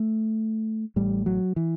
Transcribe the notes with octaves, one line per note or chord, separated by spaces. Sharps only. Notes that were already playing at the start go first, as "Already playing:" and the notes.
Already playing: A3
A1 A2 G3
F#3
E3